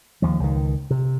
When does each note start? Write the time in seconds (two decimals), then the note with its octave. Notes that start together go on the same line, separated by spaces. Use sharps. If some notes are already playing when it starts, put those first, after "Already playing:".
0.22 D#2 F3
0.40 C#2 D#3
0.90 C3